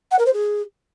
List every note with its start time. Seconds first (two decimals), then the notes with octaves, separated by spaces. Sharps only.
0.11 F#5
0.18 A#4
0.26 C5
0.33 G#4